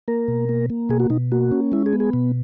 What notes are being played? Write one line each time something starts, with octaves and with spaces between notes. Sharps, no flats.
A#3 A#4
B2
A#3
A#3
B2 G#4
F#4
B2 D#4
A#3 F#4
C#4
G#3 E4
G#4
B3
G#4
B2